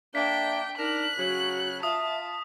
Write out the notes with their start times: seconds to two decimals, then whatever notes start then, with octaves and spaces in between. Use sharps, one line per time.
0.15 A#3 D4 E5 G5 B6
0.79 D4 D#4 A#4 F#6
1.17 C#3 F#3 F#4
1.83 F4 E5 A5 D#6